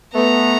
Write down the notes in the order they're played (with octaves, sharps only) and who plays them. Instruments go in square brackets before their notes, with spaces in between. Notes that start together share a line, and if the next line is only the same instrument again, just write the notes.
[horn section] A3 B3 [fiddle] A#5